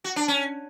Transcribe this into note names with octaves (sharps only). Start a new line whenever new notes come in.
F#4
D4
C#4